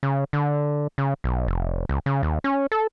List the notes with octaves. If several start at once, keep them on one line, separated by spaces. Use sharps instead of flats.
C#3
D3
C#3
B1
F1
C#2
C#3
D#2
C#4
A4